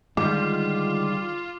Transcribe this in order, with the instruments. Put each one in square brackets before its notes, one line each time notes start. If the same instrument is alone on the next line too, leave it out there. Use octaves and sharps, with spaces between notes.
[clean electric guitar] D3 D#3 G3 [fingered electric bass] G#3 [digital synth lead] F4 [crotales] D6